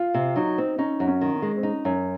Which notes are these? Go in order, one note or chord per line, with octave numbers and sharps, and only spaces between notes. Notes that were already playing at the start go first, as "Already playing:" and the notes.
Already playing: F4
C3
F#3 D#4
C4
C#4 D#4
F#2
C#4
D#3
C#4
G#3
C4
C#4 D#4
F#2